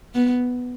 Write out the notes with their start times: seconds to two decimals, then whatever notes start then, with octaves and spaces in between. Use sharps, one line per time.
0.14 B3